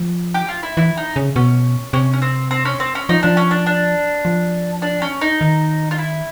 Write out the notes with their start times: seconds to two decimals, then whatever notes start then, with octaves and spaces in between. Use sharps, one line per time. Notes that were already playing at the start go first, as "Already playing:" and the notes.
Already playing: F3
0.34 G4
0.48 F4
0.63 E4
0.77 E3 E4
0.97 D#4
1.16 C#3
1.36 B2 C#4
1.93 C3 C#4
2.13 C#4
2.22 C4
2.51 C4
2.65 C#4
2.80 C4
2.95 C#4
3.09 F3 D#4
3.23 F3 D4
3.37 C#4
3.51 D4
3.66 D4
4.25 F3
4.82 D4
5.02 C#4
5.21 D#4
5.41 D#3
5.91 F4
5.98 E4